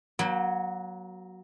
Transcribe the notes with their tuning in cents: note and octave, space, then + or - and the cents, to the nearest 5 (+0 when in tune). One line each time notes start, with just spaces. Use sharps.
F#3 +0 A#3 +40 G5 +40